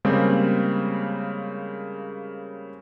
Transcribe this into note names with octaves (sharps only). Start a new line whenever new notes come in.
C#3 G3 G#3 A#3 C4